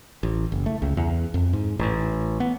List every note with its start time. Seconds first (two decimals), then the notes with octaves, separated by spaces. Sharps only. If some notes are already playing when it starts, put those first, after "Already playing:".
0.23 A1
0.52 F#1
0.66 A3
0.82 C#2
0.97 E2
1.34 F2
1.53 G#2
1.79 A1
2.40 B3